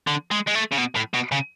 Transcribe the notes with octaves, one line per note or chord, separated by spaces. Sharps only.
D3
G#3
G#3
A3
C#3
B2
A2
B2
C#3